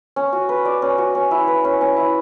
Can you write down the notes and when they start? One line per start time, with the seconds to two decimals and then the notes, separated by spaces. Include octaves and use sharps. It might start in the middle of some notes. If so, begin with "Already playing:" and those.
0.16 C#4
0.32 F#4
0.49 B4
0.65 D5
0.82 C#4
0.98 F#4
1.15 C#4
1.31 E4
1.47 B4
1.65 C#4
1.81 C#4
1.97 E4